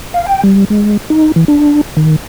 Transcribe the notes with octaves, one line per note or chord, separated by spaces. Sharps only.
F5
G5
G3
G#3
D#4
E3
D4
D#3